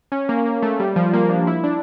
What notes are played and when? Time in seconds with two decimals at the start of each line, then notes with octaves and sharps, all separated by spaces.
0.12 C#4
0.29 A#3
0.46 A#3
0.62 A3
0.80 G3
0.96 F3
1.13 A#3
1.29 D4
1.47 E4
1.64 D4